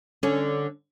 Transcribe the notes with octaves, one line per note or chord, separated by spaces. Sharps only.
D3 C#4